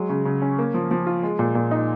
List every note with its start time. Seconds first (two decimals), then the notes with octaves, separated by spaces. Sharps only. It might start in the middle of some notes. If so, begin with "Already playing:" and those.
Already playing: F#3 G#3
0.09 C#3
0.25 C#3
0.42 C#4
0.59 A#3
0.74 F3
0.91 F3
1.07 F4
1.23 G#3
1.39 A#2
1.55 A#2
1.71 D#4